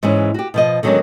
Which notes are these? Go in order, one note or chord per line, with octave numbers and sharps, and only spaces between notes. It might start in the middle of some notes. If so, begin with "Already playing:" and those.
G#2 E3 G#3 B3 C#4
F#4 G4
B2 F3 D#5
D3 D#3 F#3 G#3 B3 C#4